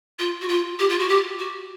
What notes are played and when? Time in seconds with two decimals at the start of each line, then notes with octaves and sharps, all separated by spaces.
0.19 F4
0.41 F#4
0.48 F4
0.79 G4
0.89 F4
0.99 F#4
1.09 G4
1.39 F#4